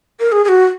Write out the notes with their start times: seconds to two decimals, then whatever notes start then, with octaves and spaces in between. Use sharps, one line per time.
0.20 A#4
0.32 G#4
0.45 G#4
0.49 F#4